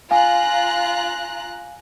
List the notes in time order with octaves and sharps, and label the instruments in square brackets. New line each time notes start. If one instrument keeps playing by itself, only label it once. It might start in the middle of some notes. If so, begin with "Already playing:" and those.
[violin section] F4 A#5 F#6 [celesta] F5 G#5